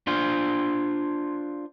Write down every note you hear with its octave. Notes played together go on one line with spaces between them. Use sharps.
D4 F4 C5